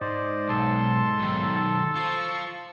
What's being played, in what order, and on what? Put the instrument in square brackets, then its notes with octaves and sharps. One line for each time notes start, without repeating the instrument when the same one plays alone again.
[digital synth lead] G#2 [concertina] C5 D5 [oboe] D#5
[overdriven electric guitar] B1 [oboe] A4 [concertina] A5 C6
[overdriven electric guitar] B1 D#3
[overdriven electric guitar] F4 C5 [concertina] A5 [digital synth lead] C#6